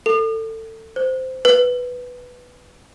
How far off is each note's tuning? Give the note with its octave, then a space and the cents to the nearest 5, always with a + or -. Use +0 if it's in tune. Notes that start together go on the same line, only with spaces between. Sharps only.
A4 +25
C5 -10
B4 +0